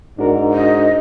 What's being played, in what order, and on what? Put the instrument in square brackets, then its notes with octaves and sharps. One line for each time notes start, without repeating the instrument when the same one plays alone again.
[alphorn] G#2 [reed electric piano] D4 F#4 A#4
[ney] D#5